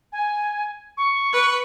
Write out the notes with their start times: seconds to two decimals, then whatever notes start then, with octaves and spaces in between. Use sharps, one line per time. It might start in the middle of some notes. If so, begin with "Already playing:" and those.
0.12 G#5
0.97 C#6
1.33 B4